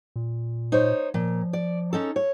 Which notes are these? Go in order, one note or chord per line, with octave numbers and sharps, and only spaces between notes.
A#2
D#4 C5 C#5
A#2 F3
D5
C#4 D#4 A4
C#5